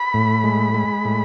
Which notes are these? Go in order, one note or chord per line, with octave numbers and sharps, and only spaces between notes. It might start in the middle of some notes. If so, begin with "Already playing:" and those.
Already playing: B5
A2
G#3
G#3
A2